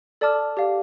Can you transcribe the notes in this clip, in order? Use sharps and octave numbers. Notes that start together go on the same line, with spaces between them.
A4 D5 A5 D6 F6
G4 D5 F5